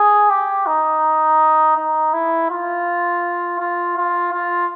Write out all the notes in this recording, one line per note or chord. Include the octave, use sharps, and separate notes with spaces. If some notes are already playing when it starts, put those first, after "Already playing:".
Already playing: G#4
G4
D#4
D#4
E4
F4
F4
F4
F4